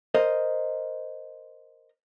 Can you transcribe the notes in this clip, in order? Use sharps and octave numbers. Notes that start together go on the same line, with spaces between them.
A#4 C5 D#5